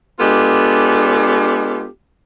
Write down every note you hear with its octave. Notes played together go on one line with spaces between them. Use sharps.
G#3 B3 D4 F4 G4 A4